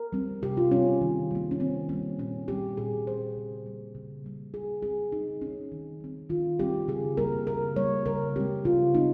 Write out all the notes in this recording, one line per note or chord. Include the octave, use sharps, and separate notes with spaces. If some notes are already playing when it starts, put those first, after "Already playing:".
Already playing: A#4
G3 C4
C3 G4
F4
G3 C4 C#4
D#3
G3 A#3
C#4
D#3 C4
G3 A#3 C#4
A#2 C#4
G3 C4 G4
A#2 G#4
G3 C4 C5
C#3
G3 A#3
C#3
G3 A#3
C#3 G#4
G#3 C4 G#4
C#3 D#4
G#3 C4 C#4
D#3
G3 C4
D#3 F4
G3 C4 G4
C#3 G#4
G3 A#3 A#4
C#3 A#4
G3 A#3 C#5
C#3 A#4
G#3 C4 G4
C#3 F4
G#3 C4 D#4